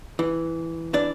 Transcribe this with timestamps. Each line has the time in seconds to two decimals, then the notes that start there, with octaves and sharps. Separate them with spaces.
0.19 E3
0.93 E3 D4 D5